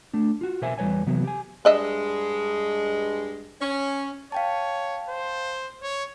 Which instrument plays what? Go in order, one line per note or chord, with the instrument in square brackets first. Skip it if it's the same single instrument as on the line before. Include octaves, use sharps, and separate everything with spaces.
[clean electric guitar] A3 D4
F4 F#4
B2 G4 A#4 C5 E5 G#5
E2 G3 B4 C#5 G#5
C3 E3 F#3 B3
G4 G#5
[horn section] G2 G#3 [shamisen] D4 D#5 E5
[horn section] C#4
[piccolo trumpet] C#5 [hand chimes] F5 G5 A5
[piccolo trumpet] C5
C#5